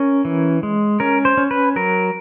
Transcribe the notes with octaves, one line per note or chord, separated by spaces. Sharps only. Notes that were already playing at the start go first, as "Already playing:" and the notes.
Already playing: C#4 A#4
E3
G#3
C#4 A#4
C5
C#4
B4
F#3 A#4